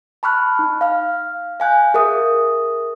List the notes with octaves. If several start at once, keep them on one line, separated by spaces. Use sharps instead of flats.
A5 B5 C#6 F6 F#6
D#4
F5 F6
F5 G#5 F#6 G6
G#4 A#4 E5 D#6